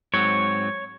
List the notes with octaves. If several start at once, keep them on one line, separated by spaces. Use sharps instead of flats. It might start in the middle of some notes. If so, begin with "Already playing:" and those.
G#2 F#3 C4 C#5